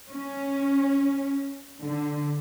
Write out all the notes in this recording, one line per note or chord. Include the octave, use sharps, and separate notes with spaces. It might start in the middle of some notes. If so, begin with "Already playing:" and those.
C#4
D3